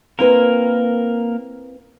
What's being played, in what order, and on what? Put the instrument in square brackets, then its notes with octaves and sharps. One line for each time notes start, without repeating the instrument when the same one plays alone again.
[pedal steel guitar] A#3 A#4 [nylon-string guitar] C4 E4 B4